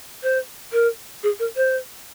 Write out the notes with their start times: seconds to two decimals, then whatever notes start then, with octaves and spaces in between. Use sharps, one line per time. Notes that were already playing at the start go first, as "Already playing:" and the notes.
0.23 C5
0.73 A#4
1.23 G#4
1.39 A#4
1.56 C5